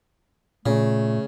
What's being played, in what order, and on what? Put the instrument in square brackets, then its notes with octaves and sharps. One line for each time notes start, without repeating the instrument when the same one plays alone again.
[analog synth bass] A#2 [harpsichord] C#3 [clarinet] A3